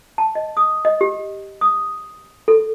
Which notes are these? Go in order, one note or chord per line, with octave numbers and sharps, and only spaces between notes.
A5
D#5
D#6
D#5
G4
D#6
A4